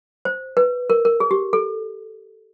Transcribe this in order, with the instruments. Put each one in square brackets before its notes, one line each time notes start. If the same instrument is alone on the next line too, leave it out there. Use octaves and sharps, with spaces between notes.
[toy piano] C5
B4
A#4
A#4
G#4
G4
A4